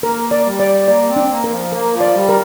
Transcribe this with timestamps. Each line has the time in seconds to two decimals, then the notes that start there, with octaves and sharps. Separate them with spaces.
0.03 A#3 A#4
0.31 D5
0.46 G3
0.59 D5
0.88 A#3 D5
1.09 C4
1.16 D4
1.30 A#3
1.44 A#4
1.51 F3
1.72 A#3 A#4
1.94 F3
2.01 D5
2.15 G3
2.29 A#4